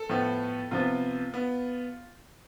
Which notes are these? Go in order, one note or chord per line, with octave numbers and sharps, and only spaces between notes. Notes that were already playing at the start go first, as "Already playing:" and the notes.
Already playing: A4
A2 F3 B3
C3 F3 B3 F4
B3